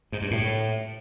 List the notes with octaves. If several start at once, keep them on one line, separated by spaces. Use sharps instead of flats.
G#2
G2
A2